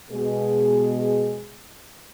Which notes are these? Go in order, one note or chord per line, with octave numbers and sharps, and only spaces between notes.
B2 G#3 G#4